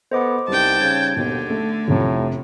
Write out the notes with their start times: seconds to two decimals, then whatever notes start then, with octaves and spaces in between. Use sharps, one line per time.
0.12 B3 A4 C5 D#5 D6
0.48 C2 G3 D#4 G5 A5
0.81 C#3 G#6
1.16 D#2 B2 D3
1.50 A3
1.88 F1 A2 C3 F3